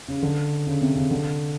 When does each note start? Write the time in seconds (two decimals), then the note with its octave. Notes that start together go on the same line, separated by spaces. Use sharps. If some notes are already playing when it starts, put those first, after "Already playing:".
0.08 C#3
0.23 D3
0.67 C#3
0.81 C3
0.96 C#3
1.11 D3